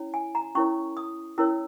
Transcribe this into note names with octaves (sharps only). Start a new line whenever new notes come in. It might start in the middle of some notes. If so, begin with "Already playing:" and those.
Already playing: C#4 E4 C#5
G#5
A#5
C#4 E4 A#4 C#5 C#6
D#6
C#4 E4 A#4 C#5 E6